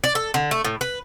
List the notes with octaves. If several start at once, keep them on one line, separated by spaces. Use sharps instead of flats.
D5
A4
D3
A3
A2
B4